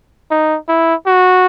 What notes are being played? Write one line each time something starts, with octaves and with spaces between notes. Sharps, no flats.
D#4
E4
F#4